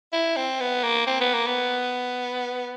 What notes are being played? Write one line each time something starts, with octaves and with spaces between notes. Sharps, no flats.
E4
C4
B3
A#3
C4
B3
A#3
B3